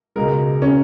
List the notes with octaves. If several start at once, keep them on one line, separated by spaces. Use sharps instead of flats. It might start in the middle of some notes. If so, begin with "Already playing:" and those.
C#2 B2 G#3 A#4
C#4